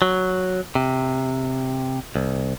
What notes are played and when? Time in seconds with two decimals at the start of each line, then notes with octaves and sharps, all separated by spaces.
0.02 F#3
0.75 C3
2.16 C2